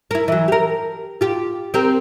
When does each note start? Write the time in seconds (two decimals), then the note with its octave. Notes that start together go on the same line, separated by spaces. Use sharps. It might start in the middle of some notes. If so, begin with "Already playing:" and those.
0.11 E4 A#4
0.28 E3 F#3
0.48 G4 A#4
1.21 F4 G4
1.74 C4 G4 A#4